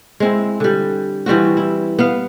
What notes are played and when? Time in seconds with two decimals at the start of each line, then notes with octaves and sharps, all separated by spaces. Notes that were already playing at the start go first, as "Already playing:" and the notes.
0.20 G#3 C4 E4
0.60 D3 G3
1.26 E3 G3 C4 F#4
1.57 E4
1.99 B3 F5